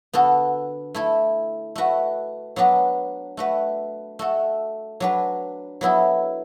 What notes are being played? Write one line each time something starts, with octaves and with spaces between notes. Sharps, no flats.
D3 B3 F#4 A4
A3 E4 A4
A3 F#4 B4
F#3 B3 D4 F#4 B4
A3 F#4 B4
A3 F#4 A4
F#3 D4 B4
F#3 B3 E4 A4